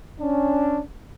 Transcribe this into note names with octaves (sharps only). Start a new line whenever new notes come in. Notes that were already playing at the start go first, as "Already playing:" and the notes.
C#4 D4